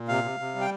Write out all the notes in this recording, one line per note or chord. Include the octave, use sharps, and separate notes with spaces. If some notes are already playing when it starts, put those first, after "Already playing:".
Already playing: A#2
C3 F5
C3
C3
G3
G5